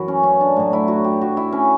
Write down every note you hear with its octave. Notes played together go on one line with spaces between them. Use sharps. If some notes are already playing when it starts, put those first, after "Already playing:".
Already playing: F#2 E3 E4 F#4
C#4
C#4
D4
A2 F#3
E4
F#4
G4
F#4
E4
C#4